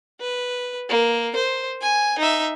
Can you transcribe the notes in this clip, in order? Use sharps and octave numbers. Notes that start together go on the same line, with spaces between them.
B4
A#3
C5
G#5
D#4 E5